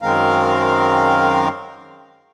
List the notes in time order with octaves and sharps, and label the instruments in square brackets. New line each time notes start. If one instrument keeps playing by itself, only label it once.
[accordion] F#2 D#3 G#3 C4 A#4 F5